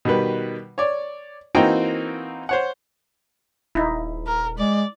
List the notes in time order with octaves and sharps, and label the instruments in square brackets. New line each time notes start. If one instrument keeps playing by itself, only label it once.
[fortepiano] B2 D#3 G3 B4
C#5 D5
E3 A#3 C4 D#4 F#4 G5
C5 C#5 F#5
[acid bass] D#1 [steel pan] D#4 E4
[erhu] A#4
[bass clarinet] G#3 [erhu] D5